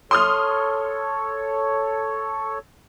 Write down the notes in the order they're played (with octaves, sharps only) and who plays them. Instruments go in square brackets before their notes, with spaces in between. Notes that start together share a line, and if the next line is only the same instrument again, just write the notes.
[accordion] A4 C#5 [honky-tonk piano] C6 D#6 F6